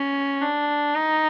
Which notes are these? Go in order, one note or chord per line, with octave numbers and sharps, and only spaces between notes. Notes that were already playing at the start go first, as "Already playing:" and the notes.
Already playing: C#4
D4
D#4